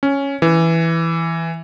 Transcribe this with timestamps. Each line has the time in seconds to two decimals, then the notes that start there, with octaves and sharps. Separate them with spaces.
0.03 C#4
0.42 E3